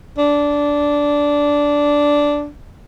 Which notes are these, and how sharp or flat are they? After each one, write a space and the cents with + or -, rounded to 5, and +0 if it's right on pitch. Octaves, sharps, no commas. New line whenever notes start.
D4 -10